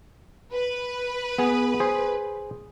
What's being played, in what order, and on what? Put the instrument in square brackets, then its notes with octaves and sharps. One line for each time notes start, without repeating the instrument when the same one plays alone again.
[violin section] B4
[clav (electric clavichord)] B3 G#4
G#4 C5